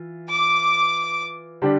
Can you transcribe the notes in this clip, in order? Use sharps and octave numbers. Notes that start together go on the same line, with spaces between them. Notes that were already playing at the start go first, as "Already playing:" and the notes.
Already playing: E3 F4
D6
D3 G3 D4 G4